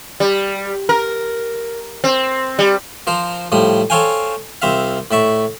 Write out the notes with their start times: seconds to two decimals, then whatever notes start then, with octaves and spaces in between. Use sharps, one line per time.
0.20 G3
0.89 A#4
2.04 C4
2.59 G3
3.07 F3 A#4 C5
3.52 A2 F3 G3 D#6
3.90 A4 C5 C#5 F5 G5 G#5
4.62 C2 C4 E5 F5
5.11 A2 D5 E5 C#6